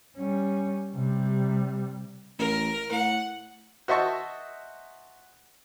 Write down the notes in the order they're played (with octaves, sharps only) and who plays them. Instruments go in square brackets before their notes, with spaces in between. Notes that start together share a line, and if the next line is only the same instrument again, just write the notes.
[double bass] G3 C#4
C3 G3
[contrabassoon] A1 [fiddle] A#4
[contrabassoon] A2 [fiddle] F#5
[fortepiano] F#4 C5 D#5 E5 A5 C#6